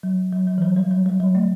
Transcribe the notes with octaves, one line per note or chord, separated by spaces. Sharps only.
F#3
F#3
F#3
E3
F#3
G3
F#3
G3
F#3
A3